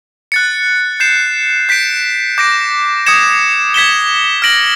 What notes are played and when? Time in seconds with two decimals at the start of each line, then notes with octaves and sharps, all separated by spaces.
0.32 F#6 A6 C#7
1.00 G6 C7 E7
1.69 G6 B6 D7
2.38 D6 G6 A#6 D7
3.06 D#6 G#6 C#7 E7
3.74 G#6 B6 E7 G7
4.42 F6 A#6 D7 F#7